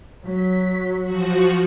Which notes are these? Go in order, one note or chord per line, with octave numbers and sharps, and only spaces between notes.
F#3 B6
F3 F#4